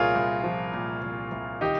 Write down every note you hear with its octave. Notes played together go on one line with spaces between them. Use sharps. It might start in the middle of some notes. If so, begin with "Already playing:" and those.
Already playing: C2 A#2 F4 G#4 A#4 C#5
C2
F3
A#2
C2
C2
D#3 D#4 G4